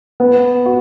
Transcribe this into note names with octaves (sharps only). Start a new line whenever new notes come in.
B3
F#4